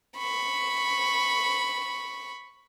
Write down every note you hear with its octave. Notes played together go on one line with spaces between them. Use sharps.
B5 C#6